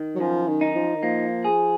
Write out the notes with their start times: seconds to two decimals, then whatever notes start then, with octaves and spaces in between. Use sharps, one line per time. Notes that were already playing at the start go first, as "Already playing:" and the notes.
Already playing: D#3
0.15 F#3
0.20 F#2 F3
0.48 D#3
0.61 D#4
0.76 F3
0.95 D#3
1.03 F3 A#3
1.45 G#4